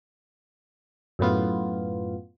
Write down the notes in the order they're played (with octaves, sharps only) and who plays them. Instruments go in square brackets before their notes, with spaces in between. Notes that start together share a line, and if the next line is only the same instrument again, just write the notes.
[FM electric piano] F#2 A2 B3 F4